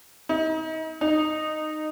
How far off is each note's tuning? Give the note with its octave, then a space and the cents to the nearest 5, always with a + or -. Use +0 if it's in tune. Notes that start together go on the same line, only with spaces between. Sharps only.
D#4 +35
D#4 -15